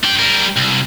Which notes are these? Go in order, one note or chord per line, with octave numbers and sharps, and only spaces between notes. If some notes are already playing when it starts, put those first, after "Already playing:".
D4 G5
G3 A#4
C2